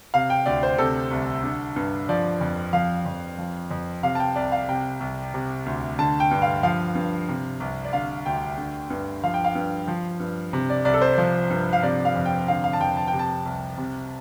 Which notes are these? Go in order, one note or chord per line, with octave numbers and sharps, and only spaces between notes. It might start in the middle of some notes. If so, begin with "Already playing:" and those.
C3 F5
G5
D2 D5
C5
C3 A4
C2
D3
G2
F3 D5
F2
F3 F5
F2
F3
F2
C3 F5
A5
G5
C2 D5
F5
C3 G5
C2
C3
D2
D3 A5
G5
G2
F5
F3 F5
G2
C3
C2
D5
D3 F5
D2 G5
D3
G2
F3 F5
G5
F5
G2
F3
G2
C3
D5
C2 D5
A4
C5
F3
G2
F5
C3 D5
F5
F2
G5
D3 F5
F5
A5
F2 G5
A5
G5
C3
A5
C2
C3